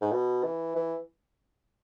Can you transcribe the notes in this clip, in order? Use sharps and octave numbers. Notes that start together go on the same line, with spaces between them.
G#2
B2
E3
E3